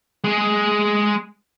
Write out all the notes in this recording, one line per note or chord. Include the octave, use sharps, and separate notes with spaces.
G#3 G#4